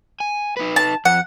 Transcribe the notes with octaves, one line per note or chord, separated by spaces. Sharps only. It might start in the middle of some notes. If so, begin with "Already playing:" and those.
G#5
D#4 B4
A5
F2 F#5